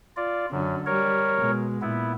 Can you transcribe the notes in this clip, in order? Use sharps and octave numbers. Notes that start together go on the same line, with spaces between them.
F4 D5
F#2 D3 F#3
G3 A#4 C#5
B2 G#3
A#2 B3 E4